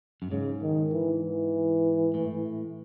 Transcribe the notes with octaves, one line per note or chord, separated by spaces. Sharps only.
F#2
G#2 C#3
D#3
E3
E3
A2